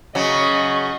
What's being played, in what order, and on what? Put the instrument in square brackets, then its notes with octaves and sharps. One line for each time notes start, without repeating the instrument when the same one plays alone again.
[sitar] C#3 F#3 [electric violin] D#5 C#6